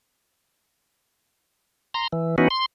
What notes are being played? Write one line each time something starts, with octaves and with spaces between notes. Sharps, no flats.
A#5 C6
E3
E3 B3 C#4 D#4 F#4
C6